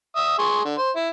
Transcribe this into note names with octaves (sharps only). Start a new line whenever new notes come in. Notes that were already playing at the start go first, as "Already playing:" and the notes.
E5 D#6
G#4 C6 C#6
D3
C5
E4